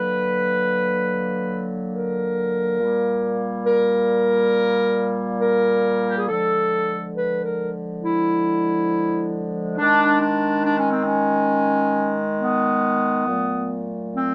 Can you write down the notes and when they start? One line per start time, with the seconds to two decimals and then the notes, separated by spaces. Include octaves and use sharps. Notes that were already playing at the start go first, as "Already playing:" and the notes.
Already playing: D3 F#3 A#3 B4
1.92 A#4
2.79 A#2 G3 A#3
3.67 A#4
5.42 A#4
6.08 G4
6.18 G#4
6.28 D3 F3 G#3 A4
7.17 B4
7.45 A#4
8.03 E4
9.78 D#3 G#3 D4
10.21 D4
10.65 D4
10.78 C#4
10.91 C4
11.04 C#4
12.39 B3
13.26 A#2 F#3 A3
14.14 C4